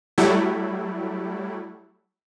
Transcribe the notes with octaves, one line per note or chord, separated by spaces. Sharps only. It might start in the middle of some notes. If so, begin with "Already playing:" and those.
F#3 G3 A3 E4